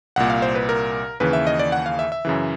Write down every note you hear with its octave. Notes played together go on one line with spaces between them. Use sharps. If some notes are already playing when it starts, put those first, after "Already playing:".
C2 A#2 F#5
F5
C5
B4
A#4
D#2 C#3 E3 B4
E5
D#5
D5
F#5
F5
E5
E5
F#2 C#3 E3